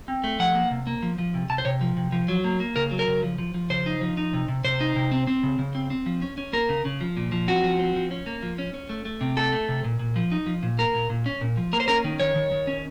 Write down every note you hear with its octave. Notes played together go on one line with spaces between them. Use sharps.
C4
A3
F3 F#5
A#3
C3
A#3
F3
F3
C3
C3 A5
C5
C3 C#5
F3
C3
F3
F#3
A#3
A#3
C#3 A#4
F#3
A#4
C#3
F3
F3
F3
C#3 C5
D#4
F3
D#4
C3
C3
C3 C5
D#4
C3
C4
C4
C#3
C#3
C4
C4
F3
C#4
C#4
A#3 A#4
C#3
C#3
F3
A#2
F3
C4 F#4
F3
C4
F3
C#4
A#3
F3
C#4
C#4
A3
A3
C3
A3 A4
A3
C3
A#2
A#2
F3
D#4
F3
A#2
A#3 A#4
A#2
A#2
C#4
A#2
F3
A#3 A#4
C5
C#4 A#4
D#3
D#3 C#5
D#3
D#3
C#4